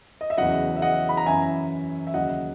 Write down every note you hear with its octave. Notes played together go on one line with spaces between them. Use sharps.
D#5
E5
E2 C#3 F#3 D#5 F#5
E5
D#5 F#5
B5
A#5
F#2 E3 E5 G#5
E5
D#2 C#3 F#3 D#5 F#5